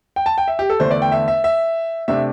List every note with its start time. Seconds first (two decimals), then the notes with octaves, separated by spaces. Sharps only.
0.16 G5
0.26 A5
0.38 G5
0.48 E5
0.59 G4
0.70 A4
0.79 E2 D3 A3 D4 C5
0.91 D5
1.02 G5
1.12 E5
1.28 E5
1.44 E5
2.08 C3 A3 D4 E5